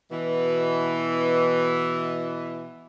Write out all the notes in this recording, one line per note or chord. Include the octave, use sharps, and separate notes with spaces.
B2 E3